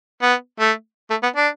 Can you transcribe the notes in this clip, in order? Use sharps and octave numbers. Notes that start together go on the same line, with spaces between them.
B3
A3
A3
B3
D4